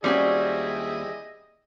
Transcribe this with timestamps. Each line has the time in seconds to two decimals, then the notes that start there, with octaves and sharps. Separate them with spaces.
0.04 D#2 G3 C4 C#4 E4 F#4 G#4 D#5